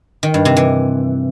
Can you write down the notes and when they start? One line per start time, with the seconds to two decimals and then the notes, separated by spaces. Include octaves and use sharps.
0.23 D#3
0.34 G2
0.45 C3
0.57 E3